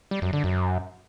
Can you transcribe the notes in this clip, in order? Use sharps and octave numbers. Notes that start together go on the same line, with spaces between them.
G3
F#2
D3
F#2